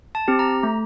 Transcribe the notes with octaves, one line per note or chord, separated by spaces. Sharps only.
A5
C4 G4
A#5
A3